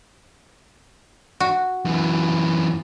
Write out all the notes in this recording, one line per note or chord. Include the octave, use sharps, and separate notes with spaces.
F#4
F#2 E3